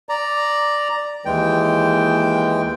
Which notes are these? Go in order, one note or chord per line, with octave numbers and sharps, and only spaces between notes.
D5 A#5
D#2 E3 G#3 G5